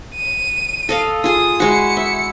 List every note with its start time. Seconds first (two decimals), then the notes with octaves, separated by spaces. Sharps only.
0.16 D#7
0.89 A4 D#5 F5
1.24 F4 G#4 D#6
1.60 G#3 E4 F#4 C#7
1.97 E5